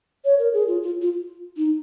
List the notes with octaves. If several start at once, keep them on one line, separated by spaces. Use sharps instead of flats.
C#5
A#4
G#4
F4
F4
F4
D#4